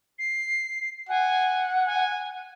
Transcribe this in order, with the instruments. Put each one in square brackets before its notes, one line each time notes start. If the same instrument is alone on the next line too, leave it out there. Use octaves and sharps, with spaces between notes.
[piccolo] C7
[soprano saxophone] F#5 [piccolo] G#5
[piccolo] G#5